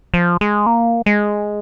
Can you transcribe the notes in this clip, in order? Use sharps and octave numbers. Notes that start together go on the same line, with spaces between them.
F3
G#3
A#3
G#3